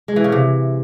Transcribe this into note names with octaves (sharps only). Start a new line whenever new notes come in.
G#3
E3
C#3
C3